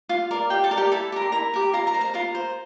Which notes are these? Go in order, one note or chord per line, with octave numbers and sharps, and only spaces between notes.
F4 F5
A#4 D5
F4 G4 G5
A4 A5
A#4 D5
G4 G5
E4 A4 A5
G4 A#4
C6
E4 A#4 A#5
G4 A#4
F4 A#4 A#5
A#4 A#5
C5
A#4 A#5
F4 A#4 A#5
C5